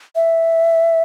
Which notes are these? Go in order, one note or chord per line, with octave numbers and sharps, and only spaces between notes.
E5